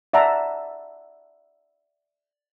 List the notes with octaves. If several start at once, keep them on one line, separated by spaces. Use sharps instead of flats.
D5 E5 F#5 A5 A#5